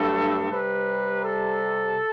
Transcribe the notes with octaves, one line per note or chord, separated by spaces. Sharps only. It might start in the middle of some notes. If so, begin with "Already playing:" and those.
Already playing: G2 F#3 A3 A4
C3 G3 B4
A4